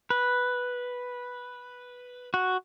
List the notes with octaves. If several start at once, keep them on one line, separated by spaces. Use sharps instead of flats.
B4
F#4